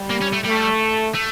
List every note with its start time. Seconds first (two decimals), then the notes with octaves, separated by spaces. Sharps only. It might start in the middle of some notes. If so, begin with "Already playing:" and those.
Already playing: G3
0.10 A#3
0.22 C#4
0.33 A3
0.45 G3 A3
1.14 A3